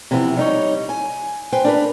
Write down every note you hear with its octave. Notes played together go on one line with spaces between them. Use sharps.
C3 E3 F3 B3 E4
G3 D#4 C#5
G#5
B4 C5 G5 G#5
D4 A#4 B4